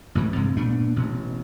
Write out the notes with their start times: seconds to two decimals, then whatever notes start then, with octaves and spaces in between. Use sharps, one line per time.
0.15 A1 G#2 E3
0.35 G2 C3 G#3
0.57 A#2 A3 B3 D4
0.96 A1 B2